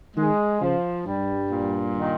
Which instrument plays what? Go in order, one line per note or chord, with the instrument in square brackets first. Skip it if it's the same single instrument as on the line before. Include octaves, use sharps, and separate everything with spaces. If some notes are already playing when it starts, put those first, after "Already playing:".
[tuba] D#3 [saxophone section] G#3
[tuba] C#3 [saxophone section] F3
[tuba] G2 [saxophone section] G3
[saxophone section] A#2
D#3